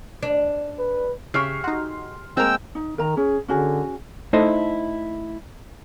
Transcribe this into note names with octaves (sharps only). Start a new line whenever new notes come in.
D4
B4
C#3 G4 G#4 E5 C#6 F6 C7
D#4 F#4 C6
G#3 A#3 C4 A#4 G5 E6
D#4
D#3 A#4 A#5
C#4 G#4
D3 C#4 F#4 G#4
A3 D#4 E4 A4 C5 D#5